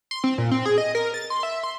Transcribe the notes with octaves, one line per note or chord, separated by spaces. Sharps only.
C6
C4
A#2
C4
G#4
D#5
A#4
A6
C6
E5
C6